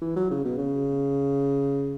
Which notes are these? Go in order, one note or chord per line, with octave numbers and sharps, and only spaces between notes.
E3
F#3
C#3
B2
C#3